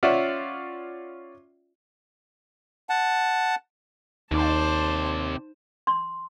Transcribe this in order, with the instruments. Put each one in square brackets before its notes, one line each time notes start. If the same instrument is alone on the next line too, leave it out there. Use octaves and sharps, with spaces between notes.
[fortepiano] C#4 F4 D5 E5 F#5
[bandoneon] F#5 A5
[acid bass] D#2 [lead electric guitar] C3 D5 [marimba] D#4 [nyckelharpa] C5 A5
[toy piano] C6